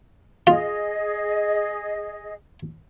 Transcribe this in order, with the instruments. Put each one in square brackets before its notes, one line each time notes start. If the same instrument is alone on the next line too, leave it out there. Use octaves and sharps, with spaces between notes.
[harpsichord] F4 [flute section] G#4 D#5